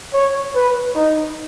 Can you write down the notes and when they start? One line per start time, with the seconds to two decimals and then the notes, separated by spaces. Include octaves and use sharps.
0.13 C#5
0.55 B4
0.95 D#4